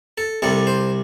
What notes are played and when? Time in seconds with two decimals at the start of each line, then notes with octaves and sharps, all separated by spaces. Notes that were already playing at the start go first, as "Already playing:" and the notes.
0.18 A4
0.42 C2 C3 G3 A4
0.67 C5